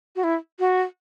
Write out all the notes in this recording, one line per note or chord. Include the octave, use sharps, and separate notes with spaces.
F#4
E4
F#4